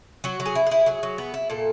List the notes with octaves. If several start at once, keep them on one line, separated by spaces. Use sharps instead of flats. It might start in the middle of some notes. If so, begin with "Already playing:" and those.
F#3 F#4
F#3
G#4
E4
E4 G#4
F#3 G#4
F#3
B3
E4
A#2 A4